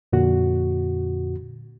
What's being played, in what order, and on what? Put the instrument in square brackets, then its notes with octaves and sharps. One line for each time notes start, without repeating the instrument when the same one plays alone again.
[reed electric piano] F2 A#2 D3 F#4